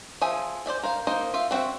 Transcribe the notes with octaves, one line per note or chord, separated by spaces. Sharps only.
F3 G#4 E5 G#5
C5 D5 E5 G#5
A#4 C5 F5
A#3 D#4 C5 D#5 F5
F4 E5 F5
B3 C4 F#4 E5 F#5